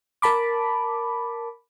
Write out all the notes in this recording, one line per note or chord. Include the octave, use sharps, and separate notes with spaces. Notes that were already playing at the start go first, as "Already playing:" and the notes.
A#4 A5 B5 D6